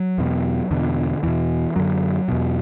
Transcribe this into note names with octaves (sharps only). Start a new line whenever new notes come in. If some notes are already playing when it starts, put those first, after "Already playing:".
Already playing: F#3
E2 B2
E2 B2 D3
E2 B2 E3
F#2 D3 F#3
E2 B2